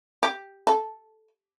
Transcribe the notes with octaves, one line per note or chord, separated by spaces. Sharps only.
G4
A4